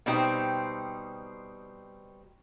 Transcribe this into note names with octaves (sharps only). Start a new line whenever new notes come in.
B2 G3 C4 D#4 C5 G5